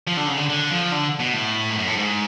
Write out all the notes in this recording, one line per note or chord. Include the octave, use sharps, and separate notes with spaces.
F3
D3
C#3
D3
D3
F3
D3
B2
A2
G#2
F#2
A2
G#2